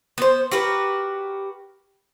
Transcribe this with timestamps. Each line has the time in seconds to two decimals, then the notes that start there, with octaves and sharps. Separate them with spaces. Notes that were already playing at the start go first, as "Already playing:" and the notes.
0.18 B3 C5
0.51 F#4 G4 A#4 B4